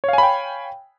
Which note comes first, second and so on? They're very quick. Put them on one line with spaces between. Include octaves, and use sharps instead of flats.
C#5 F5 G#5 B5 G5